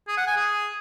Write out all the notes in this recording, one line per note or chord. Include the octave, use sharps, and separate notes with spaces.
G#4
F#5
G#5
G#4